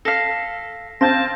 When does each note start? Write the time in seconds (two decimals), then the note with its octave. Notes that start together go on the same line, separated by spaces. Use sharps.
0.05 A4 F5 A#6 B6
1.01 C4 F5 A5 G6 A#6